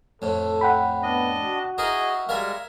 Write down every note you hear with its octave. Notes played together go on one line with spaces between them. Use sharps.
F2 A2 A4
F#5 G5 B5
B3 D4 D#5
F#4
D#4 E4 G#4 A#4 D#5
G3 G#3 A#4 E5 F5 G#5